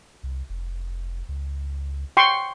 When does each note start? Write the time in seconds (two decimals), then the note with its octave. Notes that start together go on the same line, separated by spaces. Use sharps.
0.23 C2
0.50 F1
1.29 C#2
2.17 G5 C6 C#6